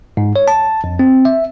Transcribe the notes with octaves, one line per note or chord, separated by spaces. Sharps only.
G#2
C#5
A5
F2
C4
E5